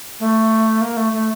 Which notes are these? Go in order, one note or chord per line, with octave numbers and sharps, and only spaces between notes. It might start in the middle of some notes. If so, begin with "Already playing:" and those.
A3
A#3
A3
A3